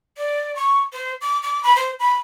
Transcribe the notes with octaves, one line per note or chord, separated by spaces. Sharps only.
D5
C#6
C5
D6
D6
B5
C5
B5